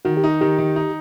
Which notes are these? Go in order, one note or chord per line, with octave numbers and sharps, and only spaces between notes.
D#3 F#4
G4
D#4
D#3 G4
D#3
D#4